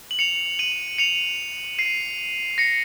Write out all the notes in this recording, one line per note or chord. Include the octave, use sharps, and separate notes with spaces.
F#7
C#7 F7
D#7 F#7
C#7 F7
C7 D#7
A#6 C#7